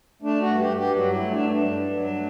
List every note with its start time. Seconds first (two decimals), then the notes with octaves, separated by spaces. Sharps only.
0.22 A3 D4
0.40 F#4
0.47 G2
0.59 G4
0.70 G2
0.77 G4
0.94 F#3 F#4
1.13 E4
1.19 A3
1.31 D4
1.43 G2
1.49 D4
1.67 G2
1.91 F#3
2.15 A3